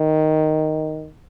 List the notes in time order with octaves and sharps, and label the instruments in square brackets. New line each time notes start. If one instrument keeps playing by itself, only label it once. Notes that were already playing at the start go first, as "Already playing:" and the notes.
Already playing: [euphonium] D#3